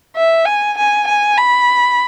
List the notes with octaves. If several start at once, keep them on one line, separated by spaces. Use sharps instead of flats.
E5
G#5
G#5
G#5
B5